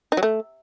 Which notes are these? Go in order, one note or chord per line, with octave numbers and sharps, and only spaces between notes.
D#4
F#3
A3